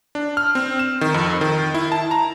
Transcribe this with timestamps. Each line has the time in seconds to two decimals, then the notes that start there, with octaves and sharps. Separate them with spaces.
0.15 D4
0.37 F6
0.55 C4
0.79 E7
1.01 D#3
1.14 F2
1.41 D#3
1.74 E4
1.92 A5
2.11 A#5